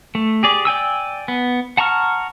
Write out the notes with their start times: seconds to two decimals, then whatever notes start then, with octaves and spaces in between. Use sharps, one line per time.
0.15 A3
0.43 G4 G#4 D5
0.65 D5 G5 G#5 E6
1.28 B3
1.77 F#5 A5 A#5 C#6 F6